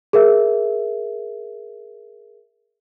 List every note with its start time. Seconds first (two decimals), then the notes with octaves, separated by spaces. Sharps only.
0.13 G#4 A#4 E5